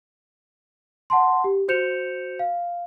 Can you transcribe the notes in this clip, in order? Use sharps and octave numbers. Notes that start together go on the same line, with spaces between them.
F#5 A5 C6
G4
F#4 C5 G6 C#7 E7 F7
F5